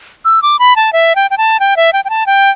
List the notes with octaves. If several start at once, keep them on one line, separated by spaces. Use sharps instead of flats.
E6
D6
B5
A5
E5
G5
G5
A5
G5
E5
G5
G5
A5
G5